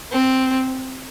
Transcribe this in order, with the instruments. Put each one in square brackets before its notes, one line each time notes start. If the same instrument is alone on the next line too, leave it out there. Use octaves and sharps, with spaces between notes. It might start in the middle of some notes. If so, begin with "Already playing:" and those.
[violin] C4